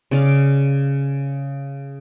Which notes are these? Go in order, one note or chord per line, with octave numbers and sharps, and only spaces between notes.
C#3 D5 F5